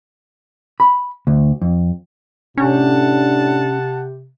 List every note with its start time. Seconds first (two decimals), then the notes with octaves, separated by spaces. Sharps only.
0.80 B5
1.27 D2
1.62 F2
2.57 A2 C3 C#4 D4 F#5 A5